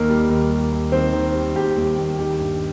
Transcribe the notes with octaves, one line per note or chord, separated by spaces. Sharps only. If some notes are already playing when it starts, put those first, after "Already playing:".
Already playing: D#2 D#3 A#3 A#4
G3
D#2
G3
D#2
D#3 C4 C5
D#3
G3
D#2 G4 G5
D#2
D#2
D#3 G4 G5
G2